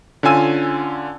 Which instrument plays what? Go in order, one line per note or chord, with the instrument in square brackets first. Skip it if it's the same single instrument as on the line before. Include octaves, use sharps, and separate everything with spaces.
[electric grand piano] D3 C#4 F4 G#5 E6 D#7